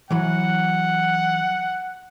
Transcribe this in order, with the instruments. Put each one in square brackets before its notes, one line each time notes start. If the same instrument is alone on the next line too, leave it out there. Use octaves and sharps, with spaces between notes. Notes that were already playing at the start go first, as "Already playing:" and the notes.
[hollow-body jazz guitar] E3 F#3 B5 [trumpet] F#5